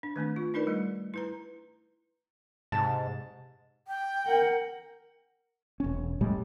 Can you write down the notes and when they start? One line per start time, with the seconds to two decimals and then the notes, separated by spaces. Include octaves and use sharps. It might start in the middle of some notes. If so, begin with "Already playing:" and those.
0.03 D4
0.16 D#3 A3 C4 D4
0.36 F4
0.54 D4 D#4 A#4 B4 D5
0.67 G3 A3
1.14 E4 B4 A#5
2.72 G#2 C3 A5
3.88 G5
4.26 A#4 F#5
5.80 E1 C#4
6.21 A2 G3 G#3